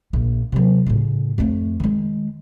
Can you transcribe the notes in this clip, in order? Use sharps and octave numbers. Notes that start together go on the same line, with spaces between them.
A#1 A#3
C3 F#3
A2 C#3
F2 A3
D#3 G#3